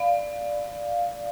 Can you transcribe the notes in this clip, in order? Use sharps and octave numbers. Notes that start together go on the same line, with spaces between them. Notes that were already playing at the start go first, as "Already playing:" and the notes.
Already playing: D5 F5